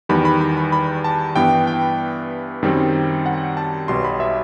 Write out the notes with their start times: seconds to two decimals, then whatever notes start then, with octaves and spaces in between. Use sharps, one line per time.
0.09 E2 D#3 G3 B5
0.25 B5
0.41 B5
0.57 B5
0.72 B5
1.04 A5
1.36 G2 E3 B3 G5
1.67 G5
2.63 F#2 D#3 G3 C4
3.26 F#5
3.57 A5
3.88 B1 B2 G3 C6
4.04 B5
4.20 E5